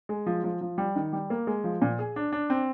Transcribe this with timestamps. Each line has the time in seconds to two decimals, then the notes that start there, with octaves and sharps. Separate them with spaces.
0.09 G#3
0.26 F3
0.44 F3
0.61 F3
0.78 G3
0.96 D#3
1.13 G3
1.30 A#3
1.47 G#3
1.64 F3
1.82 A#2
1.99 G#4
2.16 D4
2.32 D4
2.50 C4